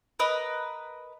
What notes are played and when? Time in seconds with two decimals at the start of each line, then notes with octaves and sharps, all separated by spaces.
0.19 A#4 B4 D#5